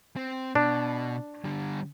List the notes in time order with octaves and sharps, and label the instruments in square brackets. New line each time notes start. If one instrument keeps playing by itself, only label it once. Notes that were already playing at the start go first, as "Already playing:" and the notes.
[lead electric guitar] C4
[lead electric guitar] B2 [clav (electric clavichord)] D4
[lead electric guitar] D3 G3